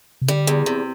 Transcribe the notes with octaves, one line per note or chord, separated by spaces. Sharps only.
C3
D3 G3
E2
C3